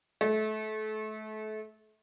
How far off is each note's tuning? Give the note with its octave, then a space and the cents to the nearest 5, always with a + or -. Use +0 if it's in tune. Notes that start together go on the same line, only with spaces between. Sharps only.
A3 -30